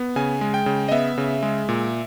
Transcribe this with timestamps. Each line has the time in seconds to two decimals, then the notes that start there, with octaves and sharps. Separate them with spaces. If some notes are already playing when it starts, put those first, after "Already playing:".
Already playing: B3
0.16 C#3 G#5
0.41 G#3
0.54 G5
0.66 C#3
0.88 D#5
0.92 B3 E5
1.18 C#3
1.43 G#3
1.69 A#2